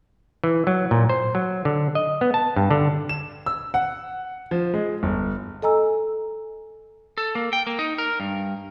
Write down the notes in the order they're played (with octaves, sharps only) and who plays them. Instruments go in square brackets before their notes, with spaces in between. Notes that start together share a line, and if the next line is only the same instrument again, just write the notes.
[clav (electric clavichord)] E3
F#3
A#2
C5
F#3
D3
D#5
B3
A5
G2
D3
[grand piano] E7
E6
F#5
F3
G#3
G1
[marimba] A4 D#5 G#5 A#5 E6
[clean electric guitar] A4
A#3
G5
A#3
D#4
A#4
G2